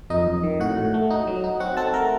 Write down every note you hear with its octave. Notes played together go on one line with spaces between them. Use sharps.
F2 D#4 D#5
F2
D#3
A2 F#4 F#5
A2
A3
D#4
F#3
D#4
C4 F#4 F#5
C4 A4 A5
A3 A#4 A#5